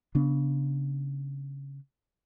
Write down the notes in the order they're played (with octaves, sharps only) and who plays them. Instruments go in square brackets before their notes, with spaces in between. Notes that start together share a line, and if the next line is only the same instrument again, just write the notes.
[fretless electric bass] C#3 B3 D4